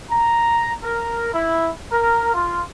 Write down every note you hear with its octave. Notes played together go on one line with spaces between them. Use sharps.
A#5
A#4
E4
A#4
F4